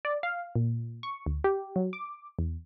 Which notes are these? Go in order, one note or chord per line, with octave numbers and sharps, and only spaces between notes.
D5
F5
A#2
C#6
D2
G4
F#3
D6
E2